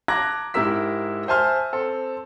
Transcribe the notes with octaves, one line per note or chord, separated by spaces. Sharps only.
A5 A#5 D6 F#6 G#6 A#6
G#2 E4 G4 A#4 E6 B6
C5 E5 G#5 A5 C6 F6
C4 A4